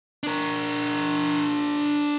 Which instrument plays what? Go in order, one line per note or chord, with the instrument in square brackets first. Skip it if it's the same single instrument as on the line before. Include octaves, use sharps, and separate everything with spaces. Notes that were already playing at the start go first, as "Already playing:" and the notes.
[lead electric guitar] D4 A#4